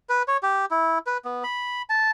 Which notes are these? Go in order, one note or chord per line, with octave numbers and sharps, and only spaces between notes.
B4
C#5
G4
E4
B4
B3
B5
A5